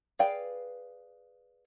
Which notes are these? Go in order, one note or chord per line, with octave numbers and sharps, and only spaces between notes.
G#4 B4 D5 F5 G5